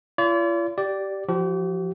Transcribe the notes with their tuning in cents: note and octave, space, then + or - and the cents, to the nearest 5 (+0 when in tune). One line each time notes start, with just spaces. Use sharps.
F4 -45 D5 -45
G4 -20 D5 +0
F3 +0 G4 -45